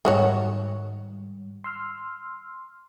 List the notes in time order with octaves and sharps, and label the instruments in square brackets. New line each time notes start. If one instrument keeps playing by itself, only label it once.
[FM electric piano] G#2 G3 [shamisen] D#3 F#4 C#5
[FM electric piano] C6 E6 F6